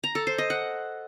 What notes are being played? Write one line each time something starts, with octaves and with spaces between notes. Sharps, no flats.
A#5
A4
C5
D#5
F#5